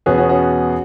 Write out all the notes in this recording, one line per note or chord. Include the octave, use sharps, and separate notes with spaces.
E2 B2 B3 C#4 F#4 G#4 B4
C#4 F#4
C#4 F#4